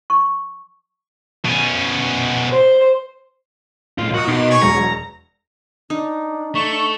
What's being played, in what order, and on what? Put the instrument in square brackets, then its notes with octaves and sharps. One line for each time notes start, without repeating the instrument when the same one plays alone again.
[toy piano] C#6
[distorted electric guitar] B2 C#4
[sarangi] C5
[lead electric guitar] B1 F4 [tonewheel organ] A2
[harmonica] A#3 [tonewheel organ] F4 A#4 D#5 [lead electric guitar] F#4
[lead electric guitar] B2 [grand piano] D#4 F#4 [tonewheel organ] B5 C6 D6
[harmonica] C#5 G#5 C#6
[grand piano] E1 C#7 F7 [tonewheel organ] F#3 G#3 [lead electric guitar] A#5
[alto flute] D4 [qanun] D#4
[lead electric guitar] A3 [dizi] C#6